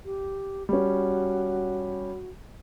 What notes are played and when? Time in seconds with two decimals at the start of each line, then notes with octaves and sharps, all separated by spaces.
0.04 G4
0.69 G3 C#4 F#4